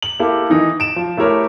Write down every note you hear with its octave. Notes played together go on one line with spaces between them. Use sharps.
F#7
A#3 E4 G4 A4
D#3 E3 D#4
D7 E7
F3
A3 E4 G4 A#4 C#5